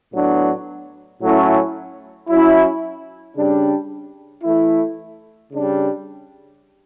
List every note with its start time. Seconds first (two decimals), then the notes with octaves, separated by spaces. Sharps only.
0.14 A2 F#3 B3 D4
1.21 A2 F#3 A3 C#4 E4
2.29 F#3 C#4 E4
3.37 C#3 G3 D4
4.44 E3 A3 E4
5.52 C#3 G3 D4